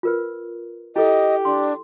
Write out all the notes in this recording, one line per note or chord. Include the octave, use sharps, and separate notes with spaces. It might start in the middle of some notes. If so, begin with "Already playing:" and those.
F4 A#4 B4
E4 G4 A4 D#5
D4 C6